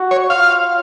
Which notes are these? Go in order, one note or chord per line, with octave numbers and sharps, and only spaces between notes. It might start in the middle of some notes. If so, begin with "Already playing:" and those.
Already playing: F#4
C#5
F4 F5